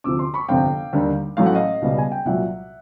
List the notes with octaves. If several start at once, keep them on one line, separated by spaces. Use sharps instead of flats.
D2 C3 F3 D6 E6
C6 D6
B5 C#6
G1 F2 C3 F5 G5
D#2 D3 G3 A#3
A1 A2 F#3 A3 F5
F#5
D#5 F5
C#2 B2 G3 B3
G#5
G5
C2 A#2 F#3 E5 F#5